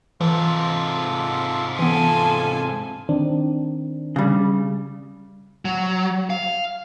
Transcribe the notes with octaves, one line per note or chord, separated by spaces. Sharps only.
G#2 C3 E3 F4 A4
E3 B3 F4 A4 G#5
D#3 C4 D4
C#3 G3
F#3
F5